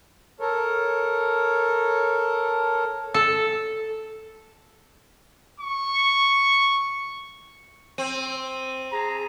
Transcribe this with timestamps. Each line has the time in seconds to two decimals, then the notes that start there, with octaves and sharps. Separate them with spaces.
0.40 A4 A#4 C#5
3.14 A4
5.60 C#6
7.98 C4 D#7
8.92 G#4 A#5